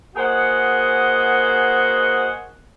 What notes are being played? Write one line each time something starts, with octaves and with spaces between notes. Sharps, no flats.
A#3 F#4 G#4 C5 D#5 F#5